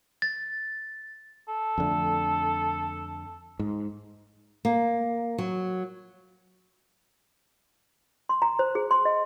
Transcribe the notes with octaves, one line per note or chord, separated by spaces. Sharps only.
A6
A4
F2 D3 A3
G#2
A#3
F#3
C6
A#5
C5
G#4
C6
D#5